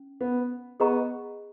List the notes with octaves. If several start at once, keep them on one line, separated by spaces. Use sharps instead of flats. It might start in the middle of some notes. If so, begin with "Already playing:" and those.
Already playing: C#4
B3
B3 G#4 D#5 F#5 A#5 C#6